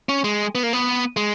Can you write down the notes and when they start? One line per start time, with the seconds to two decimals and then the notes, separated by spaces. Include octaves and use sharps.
0.09 C#4
0.24 G#3
0.55 B3
0.63 A#3
0.73 B3
1.17 G#3